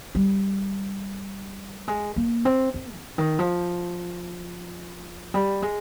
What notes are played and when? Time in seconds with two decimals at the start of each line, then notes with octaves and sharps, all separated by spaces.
0.15 G3
1.88 G#3
2.16 A#3
2.45 C4
2.74 C4
2.95 C#3
3.18 D#3
3.39 F3
5.34 G3
5.62 G#3